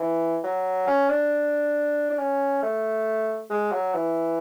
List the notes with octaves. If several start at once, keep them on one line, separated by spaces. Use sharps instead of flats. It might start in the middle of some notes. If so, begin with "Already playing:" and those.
Already playing: E3
F#3
C#4
D4
D4
C#4
A3
G#3
F#3
E3